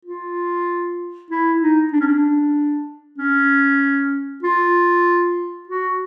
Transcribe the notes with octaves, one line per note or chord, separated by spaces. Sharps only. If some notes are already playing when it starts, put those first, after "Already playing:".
F4
E4
D#4
D4
C#4
D4
C#4
F4
F#4